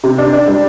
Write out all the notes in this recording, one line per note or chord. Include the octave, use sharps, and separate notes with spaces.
C3
D4
D4
G3